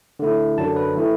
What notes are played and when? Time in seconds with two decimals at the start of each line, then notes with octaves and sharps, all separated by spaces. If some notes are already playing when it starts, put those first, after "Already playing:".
0.19 D3 A3 E4
0.58 F#2 D3 F#3 D4 A5
0.76 B4
0.97 E3 A3 E4